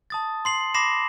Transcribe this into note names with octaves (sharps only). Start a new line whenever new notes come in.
A5 D#6 A6
C6 C7 F#7
B5 D6 A#6 C7 E7 F#7